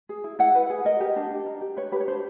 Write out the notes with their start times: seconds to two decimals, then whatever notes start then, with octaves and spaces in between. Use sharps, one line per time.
0.09 G#4
0.24 E4
0.39 E4 F#5
0.55 B4
0.70 G#4
0.85 A#4 D#5
1.00 G4
1.16 D4
1.31 D4
1.46 A#4
1.61 G4
1.77 B4 C#5
1.92 G4 B4
2.00 C#5
2.07 D4 C5